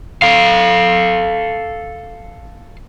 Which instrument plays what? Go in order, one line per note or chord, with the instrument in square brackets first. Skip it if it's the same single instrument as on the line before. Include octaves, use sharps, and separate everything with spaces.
[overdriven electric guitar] A4 F5